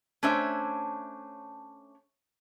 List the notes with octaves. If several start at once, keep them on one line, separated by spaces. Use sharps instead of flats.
A3 C#4 D4 C5 C#5 E5